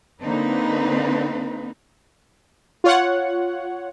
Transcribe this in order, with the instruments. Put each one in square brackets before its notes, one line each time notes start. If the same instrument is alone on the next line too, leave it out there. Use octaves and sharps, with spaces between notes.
[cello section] D3 A#3 C4 D#4 B4
[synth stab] F4 C#5 F#5